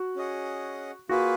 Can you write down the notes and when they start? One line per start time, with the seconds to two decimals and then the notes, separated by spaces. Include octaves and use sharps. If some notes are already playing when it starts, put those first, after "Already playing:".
Already playing: F#4
0.16 C#4 G#4 D#5 F#5
1.09 A#3 F4 F#4 G#4 B4